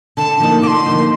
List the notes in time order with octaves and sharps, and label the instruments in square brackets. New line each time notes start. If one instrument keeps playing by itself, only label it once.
[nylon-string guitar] D3 [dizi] A5
[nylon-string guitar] F3 A#3 D#4
[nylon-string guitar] D3 [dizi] C6 D6
[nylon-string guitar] F3 A#3 D#4